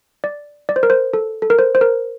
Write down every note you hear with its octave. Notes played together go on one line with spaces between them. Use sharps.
D5
D5
C5
A#4
C5
A4
A4
A#4
C5
C5
A#4